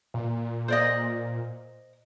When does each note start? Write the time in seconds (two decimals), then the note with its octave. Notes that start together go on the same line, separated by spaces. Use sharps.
0.14 A#2
0.68 C5 D5 D#5